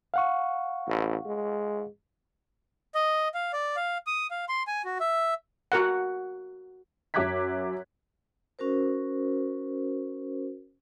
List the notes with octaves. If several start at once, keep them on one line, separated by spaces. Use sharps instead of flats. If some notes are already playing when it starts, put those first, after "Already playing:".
F5 F#5 C#6
A1
G#3
D#5
F5
D5
F5
D#6
F5
C6
G#5
F#4
E5
F#4 A#4 F#5
F#2 E5 D6 F#6 G#6 B6
C#4 F#4 A#4 C5